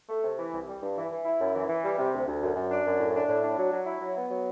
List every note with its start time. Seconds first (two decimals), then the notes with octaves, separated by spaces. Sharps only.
0.09 A3
0.24 C3
0.39 E3
0.53 C2
0.68 G3
0.82 G2
0.96 E3
1.12 E3
1.25 E4
1.40 F#2
1.54 E3
1.69 E3
1.84 G3
1.98 C3
2.13 D2
2.27 D2
2.41 F#2
2.55 F#2
2.71 D4
2.85 F#2
3.00 A2
3.14 D4
3.28 A2
3.43 D4
3.58 F#3
3.73 F#3
3.86 E4
4.01 F#3
4.16 B3
4.30 F#3